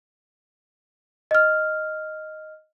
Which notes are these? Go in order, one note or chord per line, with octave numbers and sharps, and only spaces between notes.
D#5 F6